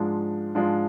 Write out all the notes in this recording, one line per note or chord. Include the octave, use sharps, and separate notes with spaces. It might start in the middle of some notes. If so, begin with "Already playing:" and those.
Already playing: G#2 F3 G#3 D4 F4
G#2 F3 G#3 D4 F4